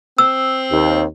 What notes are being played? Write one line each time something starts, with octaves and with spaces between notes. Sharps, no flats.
C4 E6
D#2